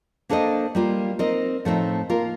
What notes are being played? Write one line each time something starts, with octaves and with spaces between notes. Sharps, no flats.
A#3 D4 A4 C5 D#5
G3 A#3 F4
C4 D#4 A#4 D#5
A2 F3 A3 C4 D#4
A#3 F4 A#4